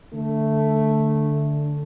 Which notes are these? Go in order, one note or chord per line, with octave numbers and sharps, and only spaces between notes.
D3 A3